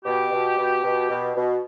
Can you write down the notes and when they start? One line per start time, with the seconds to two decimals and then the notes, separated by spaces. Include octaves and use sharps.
0.05 B2 G4
0.31 B2
0.57 B2
0.83 B2
1.09 B2
1.35 B2